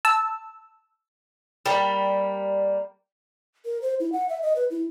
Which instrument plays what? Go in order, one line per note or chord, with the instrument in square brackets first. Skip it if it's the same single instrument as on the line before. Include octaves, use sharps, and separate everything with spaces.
[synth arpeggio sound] A5 E6
[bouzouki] G3 A#3
[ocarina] A#4
C5
E4
F#5
E5
D#5
B4
E4